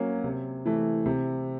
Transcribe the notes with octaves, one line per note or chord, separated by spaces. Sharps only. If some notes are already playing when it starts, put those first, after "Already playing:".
Already playing: F#3 A#3 C#4
C3
E3 A3
C3